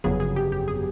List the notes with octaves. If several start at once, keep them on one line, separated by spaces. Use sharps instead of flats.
G1 F2 C#3 F#3 B3 G#4
G#4
G4
G4
G#4